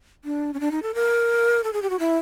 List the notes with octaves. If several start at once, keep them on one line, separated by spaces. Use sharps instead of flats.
D4
C#4
D4
D#4
A4
A#4
A4
G#4
G4
F#4
E4